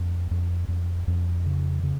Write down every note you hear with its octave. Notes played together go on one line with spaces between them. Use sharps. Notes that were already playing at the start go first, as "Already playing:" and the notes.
Already playing: F2
F2
F2
F2
C#3
C#3